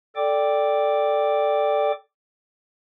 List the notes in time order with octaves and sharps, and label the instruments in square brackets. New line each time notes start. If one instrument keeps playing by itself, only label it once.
[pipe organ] A4 D5 G5 D6